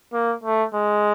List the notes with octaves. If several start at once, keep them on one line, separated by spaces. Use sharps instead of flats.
A#3
A3
G#3